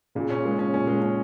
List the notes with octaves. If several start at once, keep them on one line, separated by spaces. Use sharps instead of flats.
A#2 C#3
C#4
G#3
C#4
A#2 C#4
G#3
C#4